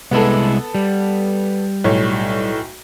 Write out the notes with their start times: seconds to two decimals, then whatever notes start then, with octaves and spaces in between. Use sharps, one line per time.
0.11 C2 G#3 B3 E4 A4
0.75 G3
1.84 B1 A2 C#5